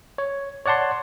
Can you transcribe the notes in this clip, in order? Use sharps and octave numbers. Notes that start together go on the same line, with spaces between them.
C#5
C#5 D5 F#5 A5 C6